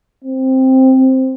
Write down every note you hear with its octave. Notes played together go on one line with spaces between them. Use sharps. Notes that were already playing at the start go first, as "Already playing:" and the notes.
C4